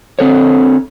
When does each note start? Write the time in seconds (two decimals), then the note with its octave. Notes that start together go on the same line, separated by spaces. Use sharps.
0.19 D3 C4 A4 C#5